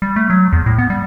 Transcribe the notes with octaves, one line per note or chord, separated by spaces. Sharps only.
G3
A3
F#3
E2
A2
B3
G3